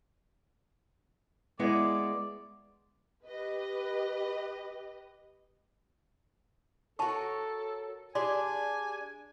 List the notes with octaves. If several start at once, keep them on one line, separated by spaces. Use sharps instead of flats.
G#3 B3 E4 D5
G4 B4 D#5
F#4 A4 A#4 C#5 A5 C#6
D4 G4 G#4 D5 G#5 C6